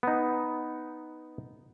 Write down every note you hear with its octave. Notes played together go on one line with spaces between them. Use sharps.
B3 D#4